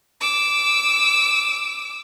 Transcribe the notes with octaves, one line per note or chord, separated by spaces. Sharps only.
D6 E6